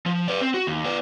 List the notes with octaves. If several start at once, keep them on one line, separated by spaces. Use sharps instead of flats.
F3
B4 D5
C4
F#4
D#2
B3 D5